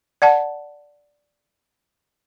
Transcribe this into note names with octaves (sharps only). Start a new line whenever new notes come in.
D5 F#5 A5